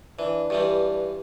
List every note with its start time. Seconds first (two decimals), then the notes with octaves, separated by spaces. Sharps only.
0.19 E3 D4
0.50 G2 E3 G3